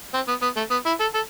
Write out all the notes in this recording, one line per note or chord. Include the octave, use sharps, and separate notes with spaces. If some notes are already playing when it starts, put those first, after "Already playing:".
C4
B3
B3
A3
B3
E4
A4
A4